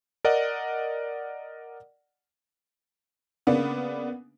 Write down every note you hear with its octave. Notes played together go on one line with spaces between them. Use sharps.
A#4 D5 D#5 F#5
C#3 A#3 B3 D4